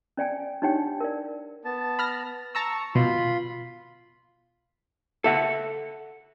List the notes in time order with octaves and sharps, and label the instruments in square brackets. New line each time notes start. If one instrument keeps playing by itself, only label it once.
[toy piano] C#4 D5 G5 G#5
D4 D#4 G4 C#5 F#5 G5
A#4 D5
[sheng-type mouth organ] B3 A5
[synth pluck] B5 F6 A#6
[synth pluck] A5 A#5 E6 [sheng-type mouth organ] C#6
[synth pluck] B2 [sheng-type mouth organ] F4 B5 C6
[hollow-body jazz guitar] A4 E5 F#5